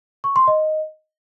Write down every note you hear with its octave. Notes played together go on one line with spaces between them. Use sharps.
C#6
C6
D#5